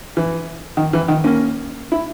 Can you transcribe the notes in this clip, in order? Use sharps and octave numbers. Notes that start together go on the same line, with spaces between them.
E3
D#3
E3
D#3
A#3 C#4
E4